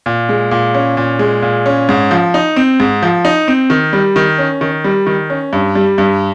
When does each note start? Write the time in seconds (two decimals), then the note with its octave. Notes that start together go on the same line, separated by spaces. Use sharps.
0.06 A#2
0.29 G#3
0.51 A#2
0.74 C#4
0.97 A#2
1.19 G#3
1.42 A#2
1.66 C#4
1.89 G#2
2.11 F3
2.34 D#4
2.56 C4
2.80 G#2
3.03 F3
3.25 D#4
3.48 C4
3.70 D#3
3.93 G3
4.16 D#3
4.38 C#4
4.61 D#3
4.84 G3
5.06 D#3
5.30 C#4
5.53 G2
5.75 G3
5.98 G2